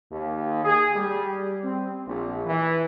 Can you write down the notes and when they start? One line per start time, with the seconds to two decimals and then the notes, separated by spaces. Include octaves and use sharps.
0.11 D#2
0.65 G#4
0.96 G3
1.64 C4
2.07 A#1
2.46 E3